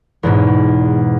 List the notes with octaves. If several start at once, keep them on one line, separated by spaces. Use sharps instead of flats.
E2 G#2 B2